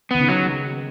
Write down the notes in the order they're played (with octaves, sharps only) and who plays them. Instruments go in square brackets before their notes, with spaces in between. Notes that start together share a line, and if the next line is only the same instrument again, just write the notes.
[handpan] D#3 [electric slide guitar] B3
[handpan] C#3
[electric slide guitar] F#3